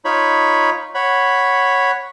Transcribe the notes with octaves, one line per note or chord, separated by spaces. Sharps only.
D#4 F4 C#5 B5
C#5 F#5 B5